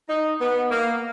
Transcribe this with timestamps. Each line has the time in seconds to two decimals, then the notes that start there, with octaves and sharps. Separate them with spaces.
0.08 D#4
0.39 B3
0.70 A#3